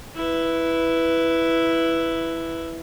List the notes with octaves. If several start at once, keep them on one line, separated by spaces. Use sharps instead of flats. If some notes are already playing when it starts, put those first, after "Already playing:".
E4 B4